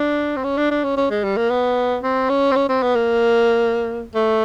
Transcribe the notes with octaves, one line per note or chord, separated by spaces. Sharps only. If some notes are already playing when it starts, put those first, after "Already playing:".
Already playing: D4
C4
C#4
D4
D4
C#4
C#4
G#3
G3
A#3
B3
C4
C#4
C4
C#4
C4
B3
A#3
A3